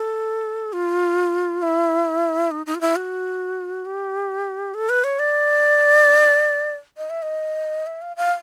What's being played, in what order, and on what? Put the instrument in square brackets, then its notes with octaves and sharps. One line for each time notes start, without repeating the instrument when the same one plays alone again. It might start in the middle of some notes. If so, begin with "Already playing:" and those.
Already playing: [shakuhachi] A4
F4
E4
D#4
D#4
F4
E4
F#4
G4
A4
B4
C#5
D5
D#5
E5
D#5
E5
F5
F5